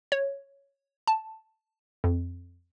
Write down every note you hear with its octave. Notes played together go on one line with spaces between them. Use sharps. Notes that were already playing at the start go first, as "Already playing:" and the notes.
C#5
A5
F2